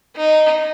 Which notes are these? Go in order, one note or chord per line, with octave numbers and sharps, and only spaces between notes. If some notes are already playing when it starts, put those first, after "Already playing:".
D#4